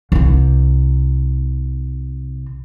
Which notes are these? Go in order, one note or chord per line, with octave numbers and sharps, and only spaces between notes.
C2 C3